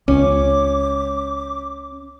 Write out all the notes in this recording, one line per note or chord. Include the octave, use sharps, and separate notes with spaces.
C#2 C#4 D6